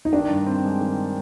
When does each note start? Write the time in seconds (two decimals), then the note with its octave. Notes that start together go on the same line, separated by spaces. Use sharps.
0.05 D#4
0.12 D#3 D4
0.30 G2
0.47 C4
0.65 G#3
0.81 D#3